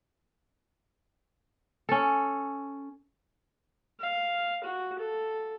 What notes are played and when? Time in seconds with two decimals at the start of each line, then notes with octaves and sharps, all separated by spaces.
1.89 C#4 A4
4.00 F5
4.64 F#4
4.99 A4